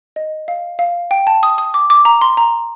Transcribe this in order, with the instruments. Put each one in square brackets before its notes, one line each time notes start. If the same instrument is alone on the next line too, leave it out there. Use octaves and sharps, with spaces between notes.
[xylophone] D#5
F5
F5
G5
A5
D#6
D#6
D6
D6
A#5
C6
A#5